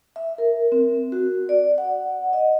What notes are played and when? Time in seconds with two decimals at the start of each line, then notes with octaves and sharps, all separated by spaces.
0.16 E5
0.38 A#4
0.72 C4
1.12 F#4
1.49 D5
1.78 F#5
2.33 D#5